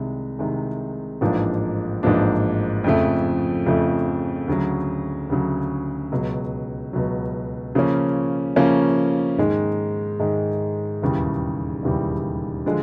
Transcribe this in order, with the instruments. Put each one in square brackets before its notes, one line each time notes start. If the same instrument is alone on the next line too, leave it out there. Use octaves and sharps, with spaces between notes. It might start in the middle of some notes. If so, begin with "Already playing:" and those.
Already playing: [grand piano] C2 C3 D#3 G#3
C2 C3 D#3 G#3
A1 G#2 F3 A#3 D4
A1 G#2 F3 A#3 D4
F2 C#3 F3 A3
F2 C#3 F3 A3
D2 C#3 F#3
D2 C#3 F#3
C#2 B2 F#3
C#2 B2 F#3
C#3 F3 A#3 C#4
C#3 F3 A#3 C#4
G#2 D#3 G#3
G#2 D#3 G#3
E1 D#2 C#3 E3 G3
E1 D#2 C#3 E3 G3
D3 F3 G#3